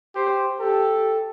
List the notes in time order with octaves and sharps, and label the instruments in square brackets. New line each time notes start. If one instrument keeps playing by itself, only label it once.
[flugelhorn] G4 [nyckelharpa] C5
[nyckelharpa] G4 [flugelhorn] A4